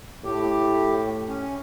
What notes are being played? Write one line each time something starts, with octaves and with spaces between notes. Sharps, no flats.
A2 G4
C#4